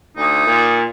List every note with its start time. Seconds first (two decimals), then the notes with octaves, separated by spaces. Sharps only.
0.16 D2 D#4
0.46 A#2